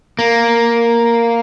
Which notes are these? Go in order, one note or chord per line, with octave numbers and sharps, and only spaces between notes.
A#3